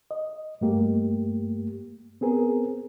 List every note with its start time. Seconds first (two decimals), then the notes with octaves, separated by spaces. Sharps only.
0.11 D#5
0.61 G2 A3 A#3 G4
2.21 B3 C4 G#4 A#4